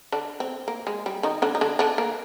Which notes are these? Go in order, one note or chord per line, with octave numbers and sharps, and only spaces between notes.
D3 D4
C4
A#3
G#3
G3
D#3 D#4
D3 D4
D#4
D3 D4
D3 D4
A#3